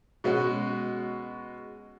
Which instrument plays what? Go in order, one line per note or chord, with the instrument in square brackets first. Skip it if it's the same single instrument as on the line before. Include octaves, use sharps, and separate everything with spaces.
[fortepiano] B2 G#3 C#4 F#4